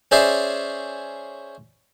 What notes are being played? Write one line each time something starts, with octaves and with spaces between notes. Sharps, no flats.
C#4 G#4 C5 D5 E5